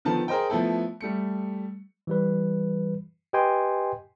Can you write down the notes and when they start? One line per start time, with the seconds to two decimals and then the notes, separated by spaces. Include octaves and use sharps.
0.05 D3 D#3 F3 B3 A5
0.28 G#4 A#4 C5 D#5 G5
0.50 F3 A3 B3 E4 A4
1.01 G3 A3 C#7
2.07 E3 G3 B4
3.33 G4 B4 D#5 G5 G#5 C6